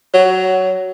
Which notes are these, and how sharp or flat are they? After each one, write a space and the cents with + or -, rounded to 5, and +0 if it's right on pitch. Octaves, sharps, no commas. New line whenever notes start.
F#3 +15